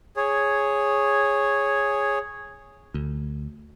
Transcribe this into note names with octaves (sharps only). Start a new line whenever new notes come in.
G#4 C#5
D2